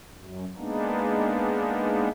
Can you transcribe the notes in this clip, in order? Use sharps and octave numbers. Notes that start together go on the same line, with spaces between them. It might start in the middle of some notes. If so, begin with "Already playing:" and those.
F#2
G#3 A#3 B3 D4 D#4